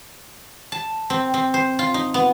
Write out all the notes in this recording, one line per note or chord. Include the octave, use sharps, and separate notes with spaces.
A5
C4
C4
C5
F4
D#4
B3